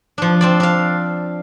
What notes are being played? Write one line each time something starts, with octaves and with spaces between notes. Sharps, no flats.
F3 D4
C4 D4 D5
D4 F5